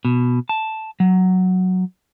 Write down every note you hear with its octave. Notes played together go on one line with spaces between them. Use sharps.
B2
A5
F#3